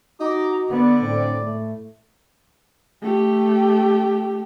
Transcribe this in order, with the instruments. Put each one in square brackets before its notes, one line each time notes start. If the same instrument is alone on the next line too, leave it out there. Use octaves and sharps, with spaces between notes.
[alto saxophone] D#4 [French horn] F#4 [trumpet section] A#5 D6
[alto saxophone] D3 [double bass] B3 [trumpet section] D5
[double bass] A2 [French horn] C4
[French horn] A3
[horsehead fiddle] A3 G4